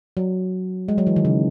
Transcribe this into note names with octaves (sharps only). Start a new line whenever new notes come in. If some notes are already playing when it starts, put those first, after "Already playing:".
F#3
G#3
F#3
E3
D#3
C#3